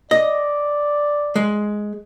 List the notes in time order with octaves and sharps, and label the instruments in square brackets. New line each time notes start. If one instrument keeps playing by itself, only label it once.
[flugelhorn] D5 [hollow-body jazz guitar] D#5
[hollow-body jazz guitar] G#3